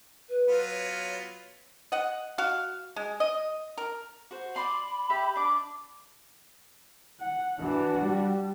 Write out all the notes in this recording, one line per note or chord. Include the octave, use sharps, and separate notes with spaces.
B4
F#3 B3 F4
C#5
D#5 F#5
F#4 F5
G#3
D#5
A#4
F#4 C5
D5 B5 C6
G4 E5
D4 D6
F#5
E3 D4 F#4
G3